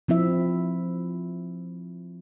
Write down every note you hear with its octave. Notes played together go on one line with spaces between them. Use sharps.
F3 C4 E4 E5